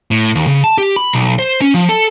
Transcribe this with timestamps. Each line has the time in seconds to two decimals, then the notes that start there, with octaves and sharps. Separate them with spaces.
0.11 A2
0.35 D#2
0.47 C#3
0.64 A5
0.78 G4
0.96 B5
1.13 B1
1.39 C5
1.61 C#4
1.74 F3
1.89 A4